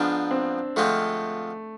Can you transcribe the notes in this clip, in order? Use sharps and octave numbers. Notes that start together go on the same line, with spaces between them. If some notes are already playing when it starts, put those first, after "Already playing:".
Already playing: G#2 F3 B3 D4 F4 G#4
C4
D3 F3 G#3 A3 C4 F4